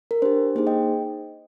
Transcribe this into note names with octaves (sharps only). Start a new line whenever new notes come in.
A#4
D4 G4 C5
A#3 D#4 G#4 C5
D#5 G5